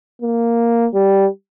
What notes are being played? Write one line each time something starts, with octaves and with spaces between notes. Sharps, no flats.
A#3
G3